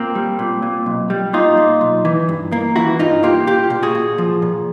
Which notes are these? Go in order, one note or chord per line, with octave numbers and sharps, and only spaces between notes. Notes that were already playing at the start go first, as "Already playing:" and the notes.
Already playing: A#2 A#3 C4
G3
A#2
A#2
B1
G3
A#2 D#4 F4
A#2
B1
E3
G2
A#3
E3 E4 F#4
G2 D#4 F4
A#3 F4 G4
A#2 F4 G4
A#2
F#4 G#4
A#2
F3
A#2